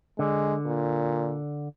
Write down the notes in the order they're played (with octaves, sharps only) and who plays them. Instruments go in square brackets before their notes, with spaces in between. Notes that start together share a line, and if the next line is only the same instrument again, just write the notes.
[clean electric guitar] D3 [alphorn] G#3
[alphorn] A#2